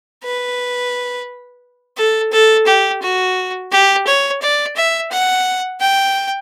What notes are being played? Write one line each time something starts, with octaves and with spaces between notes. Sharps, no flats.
B4
A4
A4
G4
F#4
G4
C#5
D5
E5
F#5
G5